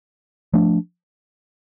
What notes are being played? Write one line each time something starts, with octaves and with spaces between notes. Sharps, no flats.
F3 A3 D4